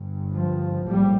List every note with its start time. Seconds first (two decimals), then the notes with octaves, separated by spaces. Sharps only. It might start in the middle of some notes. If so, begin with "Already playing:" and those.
Already playing: G1 G2
0.37 F3
0.89 A#1 A2 G3